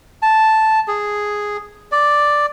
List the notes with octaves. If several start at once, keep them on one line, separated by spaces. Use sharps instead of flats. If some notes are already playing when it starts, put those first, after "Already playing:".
A5
G#4
D5